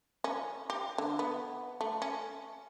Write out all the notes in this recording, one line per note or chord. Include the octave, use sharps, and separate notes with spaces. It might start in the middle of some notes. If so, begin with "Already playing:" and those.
C#4
G4
D3
B3
A3
C#4